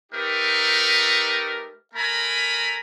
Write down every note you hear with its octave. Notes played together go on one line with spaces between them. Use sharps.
A3 D#4 G4 A#4 B4
A3 A#4 G#5 A#5 B5